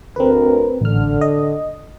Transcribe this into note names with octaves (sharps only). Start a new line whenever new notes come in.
D2 C4 A#4 B4
A1 D3 F6
D#5